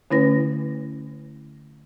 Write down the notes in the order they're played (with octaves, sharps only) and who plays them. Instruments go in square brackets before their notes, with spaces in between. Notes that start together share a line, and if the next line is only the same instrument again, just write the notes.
[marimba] D3 A3 C#4 E4 B4 A#6